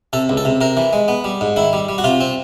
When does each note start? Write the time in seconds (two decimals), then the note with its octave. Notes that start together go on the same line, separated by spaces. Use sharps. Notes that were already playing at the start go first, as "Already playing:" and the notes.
0.13 C3 A4
0.29 C#2
0.37 A4
0.45 C3
0.61 C3 A#4
0.77 E3
0.93 G#3
1.08 B3
1.24 G3
1.41 G#2
1.56 D#3 E4
1.73 G3
1.89 G3
1.98 F#4
2.04 C3 F4
2.21 C4